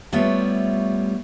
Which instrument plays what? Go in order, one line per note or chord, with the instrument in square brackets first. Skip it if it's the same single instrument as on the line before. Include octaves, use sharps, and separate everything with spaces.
[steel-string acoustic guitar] G3 A3 B3 F4 C#5 E5